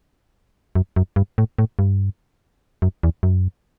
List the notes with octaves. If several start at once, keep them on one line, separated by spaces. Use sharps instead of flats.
F#2
F#2
G2
A2
A2
G2
F#2
E2
F#2